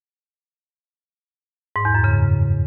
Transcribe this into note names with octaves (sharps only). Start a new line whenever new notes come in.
G#2
E2
F#2
C#3